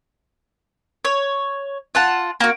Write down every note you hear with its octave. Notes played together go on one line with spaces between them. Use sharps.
C#5
F4 F#5 A5
A#3 F#4